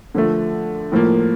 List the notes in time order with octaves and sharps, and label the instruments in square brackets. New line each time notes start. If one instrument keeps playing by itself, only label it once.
[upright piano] D3 F3 A3
A2 F3 A#3